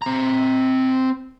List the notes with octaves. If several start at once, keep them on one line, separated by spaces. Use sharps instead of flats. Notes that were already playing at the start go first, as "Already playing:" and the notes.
C4 A#5